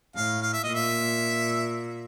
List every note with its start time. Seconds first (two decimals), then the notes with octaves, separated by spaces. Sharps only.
0.16 A2 F5
0.42 F5
0.53 E5
0.64 D#5
0.69 A#2
0.74 E5